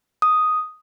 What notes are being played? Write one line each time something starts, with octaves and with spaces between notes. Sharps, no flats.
D#6